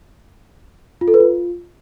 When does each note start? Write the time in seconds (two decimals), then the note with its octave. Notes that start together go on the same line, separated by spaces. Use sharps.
1.01 F4
1.08 A4
1.14 B4
1.20 F4